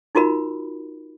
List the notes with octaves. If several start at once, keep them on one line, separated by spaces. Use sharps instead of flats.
D#4 F4 F#4 A#4 B5